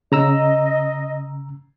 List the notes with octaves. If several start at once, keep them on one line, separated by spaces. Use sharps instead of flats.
C#3 D#5 A#5 E6